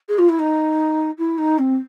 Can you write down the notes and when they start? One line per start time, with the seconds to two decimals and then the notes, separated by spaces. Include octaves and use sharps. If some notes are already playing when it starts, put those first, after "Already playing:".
0.08 G#4
0.18 F4
0.28 E4
0.38 D#4
1.18 E4
1.38 D#4
1.58 C4